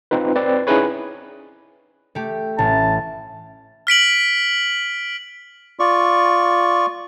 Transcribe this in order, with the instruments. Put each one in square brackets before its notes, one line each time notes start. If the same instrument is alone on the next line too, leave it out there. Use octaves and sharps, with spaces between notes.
[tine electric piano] C4 D#4 F4 B4
C4 B4 D5
C#4 D#4 E4 G#4 B4 C#5
[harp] A3 G4
[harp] A1 [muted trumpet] A5
[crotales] F6 B6 D7 F#7
[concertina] F4 D5 C#6